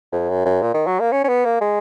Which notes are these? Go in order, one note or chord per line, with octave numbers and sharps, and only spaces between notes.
F2
F#2
F#2
A#2
D#3
F#3
A#3
C#4
C#4
B3
A#3
G#3